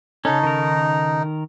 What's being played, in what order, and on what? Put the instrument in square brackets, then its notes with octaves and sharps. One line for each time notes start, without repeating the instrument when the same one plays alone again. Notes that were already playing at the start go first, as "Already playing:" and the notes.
[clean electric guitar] C#3 A4 [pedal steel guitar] C#4 [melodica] D#4
[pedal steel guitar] D#3 A#4